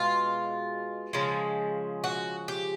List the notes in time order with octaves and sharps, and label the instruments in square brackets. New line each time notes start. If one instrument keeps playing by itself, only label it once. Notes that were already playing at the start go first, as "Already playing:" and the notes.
Already playing: [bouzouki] B2 G#3 F4
C#3 F3 G#3
F#4
G4